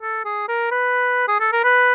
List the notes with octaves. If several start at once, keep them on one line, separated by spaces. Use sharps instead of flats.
A4
G#4
A#4
B4
G#4
A4
A#4
B4